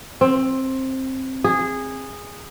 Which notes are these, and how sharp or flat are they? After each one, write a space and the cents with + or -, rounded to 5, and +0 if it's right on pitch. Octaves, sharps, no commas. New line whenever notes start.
C4 +15
G#4 -15